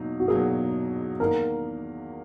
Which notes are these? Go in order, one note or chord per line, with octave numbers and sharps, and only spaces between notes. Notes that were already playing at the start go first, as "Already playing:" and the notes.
Already playing: E2 B2 F#3 A#3 D#4
F#4
E2 B2 F#3 A#3 D#4 G#4
E2 D#3 A#3 A#4